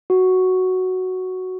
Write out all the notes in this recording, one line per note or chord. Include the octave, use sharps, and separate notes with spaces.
F#4